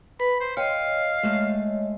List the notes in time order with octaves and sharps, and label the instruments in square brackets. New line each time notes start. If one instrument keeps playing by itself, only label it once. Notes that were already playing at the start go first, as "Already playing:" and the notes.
[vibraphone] B4 [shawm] B5
[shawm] C5
[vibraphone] C#5 D#5 [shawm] F5 [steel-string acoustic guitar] G5
[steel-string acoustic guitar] G#3 A3